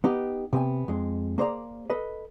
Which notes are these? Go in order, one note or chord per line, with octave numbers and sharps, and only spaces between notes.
B3 D#4 G4
C3 B3 G5 G#5
F2 G#3
A#3 G#4 C5 D5 F5 A#5
A4 B4 D#5